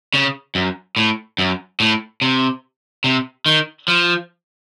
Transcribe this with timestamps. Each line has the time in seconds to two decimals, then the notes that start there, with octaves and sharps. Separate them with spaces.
0.14 C#3
0.55 F#2
0.97 A2
1.38 F#2
1.80 A2
2.22 C3
3.04 C3
3.46 D#3
3.88 F3